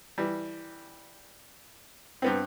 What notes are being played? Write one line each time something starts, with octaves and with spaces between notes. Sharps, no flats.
E3 G3
G2 B3 C4